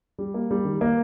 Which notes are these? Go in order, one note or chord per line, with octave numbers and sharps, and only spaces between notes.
G3
A#3
G3
D#3
A#3